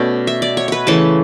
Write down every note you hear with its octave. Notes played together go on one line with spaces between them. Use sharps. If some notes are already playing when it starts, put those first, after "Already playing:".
Already playing: B2 A3 C#4 D5
E5
D5
C#5
B4 C#5
C#3 E3 A3 A5